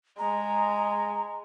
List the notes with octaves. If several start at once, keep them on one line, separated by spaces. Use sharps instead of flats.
G#3 A#5